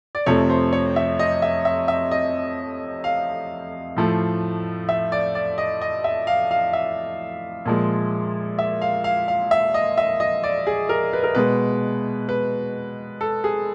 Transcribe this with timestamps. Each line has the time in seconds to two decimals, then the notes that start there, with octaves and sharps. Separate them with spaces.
0.15 D5
0.26 F2 C3 F3 A3 C#5
0.50 C5
0.73 C#5
0.96 E5
1.19 D#5
1.42 E5
1.65 E5
1.88 E5
2.11 D#5
3.04 F5
3.97 A2 F3 A3
4.89 E5
5.12 D5
5.35 D5
5.58 D#5
5.82 D#5
6.04 E5
6.27 F5
6.51 F5
6.73 E5
7.66 A#2 F3 G#3
8.59 E5
8.81 F5
9.04 F5
9.28 F5
9.51 E5
9.74 D#5
9.98 E5
10.20 D#5
10.44 D5
10.67 G#4
10.89 A#4
11.13 B4
11.23 A#4
11.35 B2 G#3 B4
12.29 B4
13.21 A4
13.44 G#4